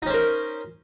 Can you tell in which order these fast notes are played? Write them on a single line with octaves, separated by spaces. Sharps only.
D#4 C#4 C5 A#4